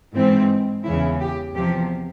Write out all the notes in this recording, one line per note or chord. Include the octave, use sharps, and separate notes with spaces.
G#2 E3 C4
E2 C#3 E3 E4
G4
E2 C3 F3 G4